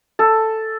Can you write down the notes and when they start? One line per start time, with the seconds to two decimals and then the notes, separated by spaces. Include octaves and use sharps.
0.19 A4